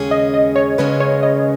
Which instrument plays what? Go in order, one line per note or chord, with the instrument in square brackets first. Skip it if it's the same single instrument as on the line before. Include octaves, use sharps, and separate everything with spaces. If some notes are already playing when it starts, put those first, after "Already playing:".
Already playing: [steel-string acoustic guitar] D#2 C#3 G#3 C#4 G#4
[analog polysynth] D#5
D#5
C#5
[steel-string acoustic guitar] D#2 C#3 G#3 C#4 G#4 [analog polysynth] B4
[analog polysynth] C#5
D#5